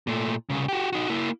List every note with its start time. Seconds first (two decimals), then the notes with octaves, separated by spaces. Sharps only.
0.07 A#2 A3
0.50 C2 C#3
0.68 F#4 G4
0.93 D#4 F#4
1.09 A#3 E4